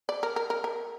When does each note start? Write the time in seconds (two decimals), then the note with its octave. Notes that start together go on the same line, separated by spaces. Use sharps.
0.09 D5
0.23 A#4
0.36 A#4
0.50 A#4
0.64 A#4